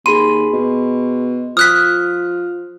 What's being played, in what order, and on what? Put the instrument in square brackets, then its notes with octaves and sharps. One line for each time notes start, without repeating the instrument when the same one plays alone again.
[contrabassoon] D#2 [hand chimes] G#4 B5 C6 [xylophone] D#7
[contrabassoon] B2
[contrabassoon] F3 [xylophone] D#6 F#6 B6 [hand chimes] F6